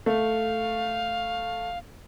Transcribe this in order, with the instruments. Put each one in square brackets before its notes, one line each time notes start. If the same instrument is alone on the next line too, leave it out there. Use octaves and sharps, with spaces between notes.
[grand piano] A3 [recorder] F5